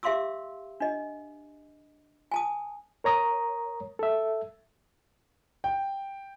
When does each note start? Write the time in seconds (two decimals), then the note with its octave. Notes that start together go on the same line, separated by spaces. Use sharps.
0.03 G4 E5 F5 C6 D6 E6
0.80 D4 D#5
2.32 G#5 A5 D#6
3.04 A#4 C#5 A#5 D#6
3.99 A4 E5
5.64 G5